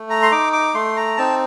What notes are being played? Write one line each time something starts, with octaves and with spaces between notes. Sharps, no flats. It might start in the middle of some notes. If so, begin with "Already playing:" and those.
Already playing: A3
A#5
C6
D#4 D6
D6
A3 C6
A#5
C4 D#4 A5